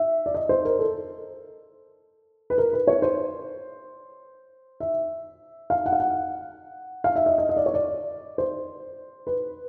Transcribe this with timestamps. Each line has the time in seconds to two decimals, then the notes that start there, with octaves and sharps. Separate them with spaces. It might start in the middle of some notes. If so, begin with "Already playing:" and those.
Already playing: E5
0.26 D5
0.34 D#5
0.49 C5
0.65 A#4
0.79 A4
2.50 B4
2.58 A#4
2.73 B4
2.87 C#5
3.02 C5
4.80 E5
5.70 F5
5.86 F#5
5.92 F5
6.00 F#5
7.04 F5
7.16 E5
7.26 D#5
7.38 D#5
7.49 D#5
7.57 D5
7.66 C#5
7.74 D5
8.38 C5
9.27 B4